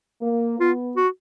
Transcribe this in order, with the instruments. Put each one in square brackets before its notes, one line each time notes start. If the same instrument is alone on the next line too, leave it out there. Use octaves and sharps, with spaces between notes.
[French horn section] A#3
[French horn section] B3 [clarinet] F4
[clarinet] F#4